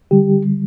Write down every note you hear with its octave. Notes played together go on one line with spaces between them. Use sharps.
D3 G3 G4